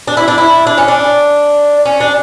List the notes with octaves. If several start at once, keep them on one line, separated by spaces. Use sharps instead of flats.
D4
E4
D4
E4
D4
C#4
D4
C#4
D4